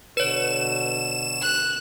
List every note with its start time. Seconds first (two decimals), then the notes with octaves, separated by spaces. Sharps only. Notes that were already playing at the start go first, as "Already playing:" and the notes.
0.17 B2 D3 B4 C#5 E7
1.41 F#6